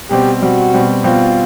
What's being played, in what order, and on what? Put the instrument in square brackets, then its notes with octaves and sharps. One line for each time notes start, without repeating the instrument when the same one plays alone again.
[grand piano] B2 G3 C4 [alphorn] G4
[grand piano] B2 G3 C4 [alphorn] F#4
[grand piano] B2 G3 C4
[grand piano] B2 G3 C4 [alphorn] F4